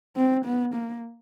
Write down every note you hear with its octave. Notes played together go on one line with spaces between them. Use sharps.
C4
B3
A#3